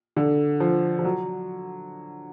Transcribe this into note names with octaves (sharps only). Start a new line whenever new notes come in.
D3
F3
F3
F#3